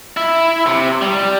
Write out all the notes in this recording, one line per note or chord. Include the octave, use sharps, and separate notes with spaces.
E4
C3
G3